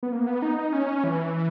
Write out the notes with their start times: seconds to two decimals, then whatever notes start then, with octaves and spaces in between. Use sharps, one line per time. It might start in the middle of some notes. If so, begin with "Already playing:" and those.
0.03 B3
0.12 A#3
0.27 B3
0.42 D#4
0.58 D#4
0.73 C#4
1.04 E3